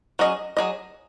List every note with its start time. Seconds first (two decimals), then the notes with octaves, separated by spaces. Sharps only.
0.19 F#3 C#4 G#4 D#5
0.57 F#3 C#4 G#4 D#5